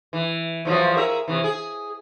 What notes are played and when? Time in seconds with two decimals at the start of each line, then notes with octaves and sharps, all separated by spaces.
0.13 E3
0.65 E2 F3 F#3
0.96 G#4 A#4 E5
1.28 C3 E3
1.44 G#4